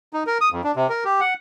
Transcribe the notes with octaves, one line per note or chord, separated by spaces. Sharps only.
D#4
A#4
D#6
F2
D4
C3
A#4
G4
F#5